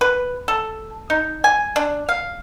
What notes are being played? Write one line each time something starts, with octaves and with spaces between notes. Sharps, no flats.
B4
A4
D#4
G#5
D4
F5